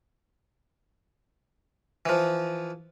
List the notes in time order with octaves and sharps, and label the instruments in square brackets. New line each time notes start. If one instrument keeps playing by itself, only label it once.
[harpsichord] E3 F3